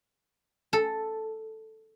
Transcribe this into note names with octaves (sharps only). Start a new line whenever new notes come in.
A4